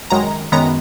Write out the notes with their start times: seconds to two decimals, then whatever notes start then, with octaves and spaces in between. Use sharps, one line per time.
0.10 F#2 D#3 G#3 A#5
0.52 F#2 D#3 G#3 B3 A#5